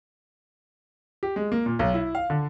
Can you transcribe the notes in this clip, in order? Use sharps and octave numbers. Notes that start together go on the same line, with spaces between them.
G4
G#3
A#3
A#2
B1
E4
F5
D3